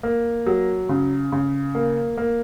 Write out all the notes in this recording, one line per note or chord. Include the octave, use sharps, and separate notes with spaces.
A#3
F#3
C#3
C#3
A#3
A#3